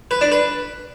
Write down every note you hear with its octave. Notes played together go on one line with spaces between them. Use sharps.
B4
D4
B4